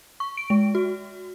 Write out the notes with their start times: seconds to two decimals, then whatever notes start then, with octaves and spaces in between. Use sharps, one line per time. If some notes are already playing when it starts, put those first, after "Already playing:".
0.20 C#6
0.37 D7
0.50 G#3
0.75 F#4